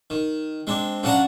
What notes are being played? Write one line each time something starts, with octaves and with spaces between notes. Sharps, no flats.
D#3
G#3 C4 D4
C#3 F#3 D4 F#5 A5 A#5